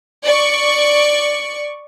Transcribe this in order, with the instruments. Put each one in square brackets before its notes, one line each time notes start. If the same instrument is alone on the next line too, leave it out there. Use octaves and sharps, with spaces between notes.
[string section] D5 C#6